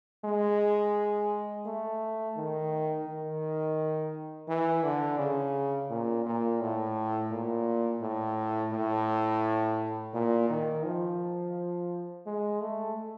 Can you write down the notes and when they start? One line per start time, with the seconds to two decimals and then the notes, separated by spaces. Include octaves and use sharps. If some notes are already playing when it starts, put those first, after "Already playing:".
0.25 G#3
1.66 A3
2.37 D#3
3.08 D#3
4.49 E3
4.84 D3
5.19 C#3
5.90 A#2
6.26 A#2
6.61 A2
7.31 A#2
8.02 A2
8.73 A2
10.14 A#2
10.50 D#3
10.85 F3
12.26 G#3
12.62 A3